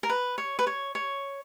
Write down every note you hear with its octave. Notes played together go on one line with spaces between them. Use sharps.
A#4
B4
C#5
B4
C#5
C#5